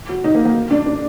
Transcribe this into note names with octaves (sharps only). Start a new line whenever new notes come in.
F#4
D#4
A#3
A#3
D4
D4